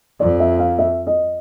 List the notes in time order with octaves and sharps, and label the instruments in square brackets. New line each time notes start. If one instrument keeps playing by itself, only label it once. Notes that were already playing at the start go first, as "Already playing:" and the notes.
[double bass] F2 [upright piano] D5
[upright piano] E5
F5
E5
D#5